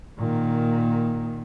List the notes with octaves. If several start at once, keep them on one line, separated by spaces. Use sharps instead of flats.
A#2 D#3